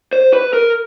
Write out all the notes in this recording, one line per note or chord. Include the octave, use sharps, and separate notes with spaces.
C5
B4
A#4